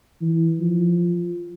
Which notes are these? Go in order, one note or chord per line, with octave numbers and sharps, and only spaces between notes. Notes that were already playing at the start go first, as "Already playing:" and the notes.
E3
F3